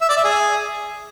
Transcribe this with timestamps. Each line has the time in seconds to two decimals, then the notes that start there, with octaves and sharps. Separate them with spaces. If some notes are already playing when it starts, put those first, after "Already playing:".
0.01 E5
0.09 D5
0.17 E5
0.24 G#4